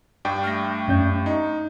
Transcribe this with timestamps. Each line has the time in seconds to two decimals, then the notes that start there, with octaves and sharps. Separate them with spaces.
0.25 G2 D5 G5
0.44 A3 F6 A#6
0.88 F#2 C#4 G6
1.26 D#4